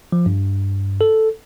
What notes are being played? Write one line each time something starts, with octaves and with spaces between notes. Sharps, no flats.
F3
G2
A4